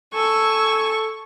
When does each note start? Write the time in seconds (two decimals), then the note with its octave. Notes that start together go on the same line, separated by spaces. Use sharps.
0.14 A4 G#5 C#6 E6